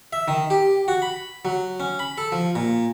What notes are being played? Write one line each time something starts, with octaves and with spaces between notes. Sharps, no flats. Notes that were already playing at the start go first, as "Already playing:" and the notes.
E5
D#3
G4
F#4
B5
F#3
C#4
B5
A4
F3
A#2